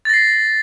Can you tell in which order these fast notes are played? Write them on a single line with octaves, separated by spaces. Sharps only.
A6 A#6 C7